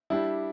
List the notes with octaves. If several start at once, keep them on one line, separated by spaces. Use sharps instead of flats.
G3 D4 E4 G4